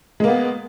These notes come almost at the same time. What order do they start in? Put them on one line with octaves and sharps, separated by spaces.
G#3 A#3 B3